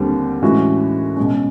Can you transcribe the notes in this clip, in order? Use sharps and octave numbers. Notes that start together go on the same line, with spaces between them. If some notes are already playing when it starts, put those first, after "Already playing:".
Already playing: D#2 D3 G3 C4
A2 E3 G#3 C#4 F#4
B2 G#3 C#4